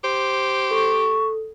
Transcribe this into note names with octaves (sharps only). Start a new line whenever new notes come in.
G4 C5
A4 C#6